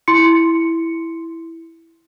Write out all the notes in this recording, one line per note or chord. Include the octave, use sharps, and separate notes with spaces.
E4 C6 C#7